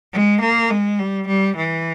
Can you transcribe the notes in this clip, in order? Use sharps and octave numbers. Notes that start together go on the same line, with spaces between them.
G#3
A#3
G#3
G3
G3
E3